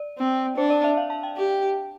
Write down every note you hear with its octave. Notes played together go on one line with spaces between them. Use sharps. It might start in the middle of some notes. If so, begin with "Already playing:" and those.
Already playing: D5
C4
D4 C5
D5
E5
F5
A5
G5
G4